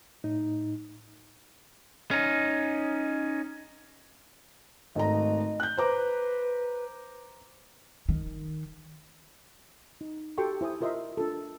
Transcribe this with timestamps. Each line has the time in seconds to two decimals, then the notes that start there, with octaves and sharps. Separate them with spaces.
0.24 A2 D#4
2.11 C#4 D#4
4.95 G#1 A3 D#5 A#5
5.60 F#6 G6
5.77 B4 C5 A#5 D6
8.09 D#3
10.01 D#4
10.38 F#4 G4 A4 G5 C6 C#6
10.61 E4 C5 G#5 D#6
10.81 F4 A#4 C5 D#5 E5 C6
11.17 D4 F4 A4